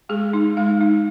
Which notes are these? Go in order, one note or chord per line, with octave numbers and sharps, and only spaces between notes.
G#3 G#4
D#4
G#3 F5
D#4